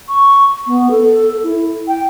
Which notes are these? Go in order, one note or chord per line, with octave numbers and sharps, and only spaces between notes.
C#6
B3
A4
E4
G5